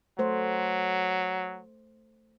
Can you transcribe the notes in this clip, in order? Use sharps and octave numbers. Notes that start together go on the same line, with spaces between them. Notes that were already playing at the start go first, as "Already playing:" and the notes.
F#3 A3 C5